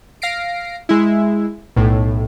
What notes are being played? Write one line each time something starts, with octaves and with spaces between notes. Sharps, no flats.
F5 A#6 C7 D7
G#3 E4
B1 A2